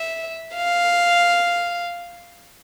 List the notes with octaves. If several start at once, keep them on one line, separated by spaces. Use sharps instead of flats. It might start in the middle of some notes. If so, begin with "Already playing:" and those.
Already playing: E5
F5